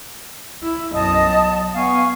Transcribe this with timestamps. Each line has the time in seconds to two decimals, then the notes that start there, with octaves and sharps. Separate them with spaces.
0.63 E4
0.93 B1 F#2 D#5 A5 D#6
1.30 F#3
1.74 B3 F5 G#5 C#6